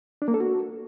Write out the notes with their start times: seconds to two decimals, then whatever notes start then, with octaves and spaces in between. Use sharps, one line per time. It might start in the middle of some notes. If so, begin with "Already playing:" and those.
0.22 D4
0.28 A#3
0.34 A4
0.40 F#4